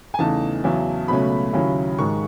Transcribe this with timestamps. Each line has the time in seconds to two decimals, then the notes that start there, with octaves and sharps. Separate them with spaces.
0.14 G#5
0.18 E2 C#3 E3 A3 D#4 A5
0.64 E2 C#3 F#3 C#4 E4
1.08 C#2 B2 F#3 A3 C#4 B5
1.53 D#2 C#3 F#3 C#4 E4
1.98 G#2 D#3 G#3 C#6